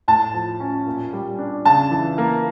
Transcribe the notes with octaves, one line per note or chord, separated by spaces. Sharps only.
A2 A5
F3
C#4
A#2
G3
D4
C#3 A5
E3
A#3